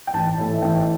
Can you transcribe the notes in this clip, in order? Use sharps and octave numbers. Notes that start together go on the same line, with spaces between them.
G5
A1 A5
A2 E3 A3
E5
A1 G5